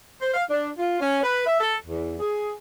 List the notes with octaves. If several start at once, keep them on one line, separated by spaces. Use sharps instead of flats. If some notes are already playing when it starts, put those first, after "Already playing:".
C5
F5
D4
F4
C#4
B4
E5
A4
E2
G#4